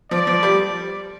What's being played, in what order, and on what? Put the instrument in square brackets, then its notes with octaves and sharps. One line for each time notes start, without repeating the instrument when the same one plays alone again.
[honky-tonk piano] F3 [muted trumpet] D5
[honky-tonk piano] F3
G3